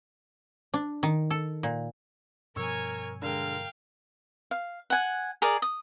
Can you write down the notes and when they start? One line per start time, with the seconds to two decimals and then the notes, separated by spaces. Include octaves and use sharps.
0.74 D4
1.03 D#3
1.30 A4
1.63 A#2
2.56 G2 B2 F3 A#4 C#5 G#5 C#6 E6
3.22 D3 G#3 A#4 F5 G5
4.51 F5
4.90 F#5 G#5
5.42 G#4 A#4 D5
5.62 D#6